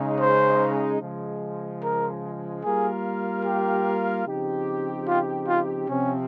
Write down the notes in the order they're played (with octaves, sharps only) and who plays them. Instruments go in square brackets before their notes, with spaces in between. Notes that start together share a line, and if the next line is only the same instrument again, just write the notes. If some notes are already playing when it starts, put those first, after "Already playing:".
Already playing: [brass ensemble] C#3 G#3 D#4
[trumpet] C5
[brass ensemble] C#3 F3 G#3
[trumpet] A#4
[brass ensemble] G3 A#3 F4 A#4 F5 [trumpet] G#4
[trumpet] G4
[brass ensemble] C#3 F3 C4 D#4 G4
[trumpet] F4
F4
[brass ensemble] C3 F3 C4 [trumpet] C#4